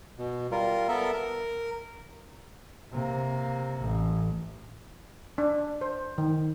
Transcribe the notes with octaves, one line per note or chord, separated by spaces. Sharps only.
B2
G3 F4 A#4
B3 A4 A#4 E5
A#4
C3 A#3
A1
D4
C5
D#3